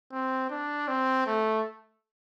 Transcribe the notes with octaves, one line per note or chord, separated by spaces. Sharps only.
C4
D4
C4
A3